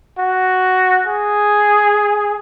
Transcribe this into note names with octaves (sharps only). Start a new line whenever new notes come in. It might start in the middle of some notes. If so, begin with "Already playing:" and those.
F#4
G#4